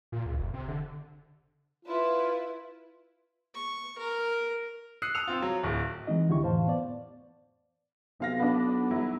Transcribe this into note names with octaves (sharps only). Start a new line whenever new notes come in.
A#2
C#2
F1
C3
D3
E4 F4 B4
C#6
A#4
D#6 E6 F#6 C7 C#7
D#6 E6 C#7 F7
C4 F4
F#3
D1
E3 G#3 C4 D#4 D#5
C#2 D3 E4 G4 C#6
F2 A2 E3 C5 F5 A5
B3 D5
B1 C3 F5 A#6
B3 D4
F#3 E4